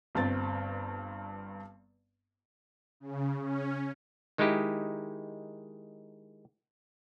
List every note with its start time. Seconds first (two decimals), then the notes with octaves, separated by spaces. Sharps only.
0.15 G1 G2 C4 A6
3.00 C#3
3.41 C#4
4.38 D#3 G#3 D#4 E4 G4